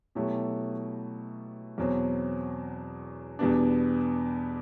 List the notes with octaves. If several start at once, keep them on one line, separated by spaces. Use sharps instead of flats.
B2 F#3 A3 E4 G4
E2 B2 F#3 C4
E2 B2 G3 B3 D4